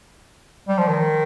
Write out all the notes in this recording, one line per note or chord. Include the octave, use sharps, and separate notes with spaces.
G3
F3
D#3